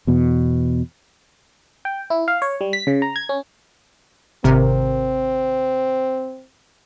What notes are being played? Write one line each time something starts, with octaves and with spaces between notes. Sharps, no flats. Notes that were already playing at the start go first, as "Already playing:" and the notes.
E2 B2
G5
E4
F5
C#5
G3
B6
C#3
A#5
G#6
C#4
G#1 C3 C4 A#4